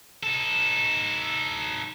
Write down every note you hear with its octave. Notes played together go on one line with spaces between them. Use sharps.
D#4 A4